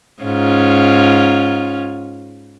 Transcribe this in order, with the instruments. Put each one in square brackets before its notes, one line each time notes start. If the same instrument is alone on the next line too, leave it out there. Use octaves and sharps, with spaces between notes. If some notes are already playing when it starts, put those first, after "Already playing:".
[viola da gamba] G#2 C#4 F4